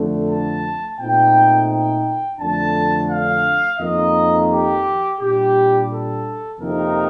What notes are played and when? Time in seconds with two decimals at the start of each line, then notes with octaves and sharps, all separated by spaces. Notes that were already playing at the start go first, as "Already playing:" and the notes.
Already playing: F2 D3 A3 D4
0.28 A5
0.98 A#2 A3 C4 D#4 G5
1.68 G5
2.38 F2 D3 A3 D4 A5
3.09 F5
3.78 F2 D#3 A#3 D#5
4.50 G4
5.19 A#2 G3 D4 G4
5.90 A4
6.60 F2 C3 D#3 A#3 D#4 A#4